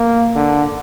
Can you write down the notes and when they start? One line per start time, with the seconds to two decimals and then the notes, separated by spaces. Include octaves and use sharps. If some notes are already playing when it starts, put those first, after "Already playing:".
Already playing: A#3
0.36 D3